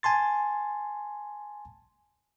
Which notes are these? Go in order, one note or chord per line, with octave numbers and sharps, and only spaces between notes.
G#5 A5 C6 A6